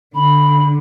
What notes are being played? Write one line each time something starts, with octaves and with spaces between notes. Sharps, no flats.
D3 B5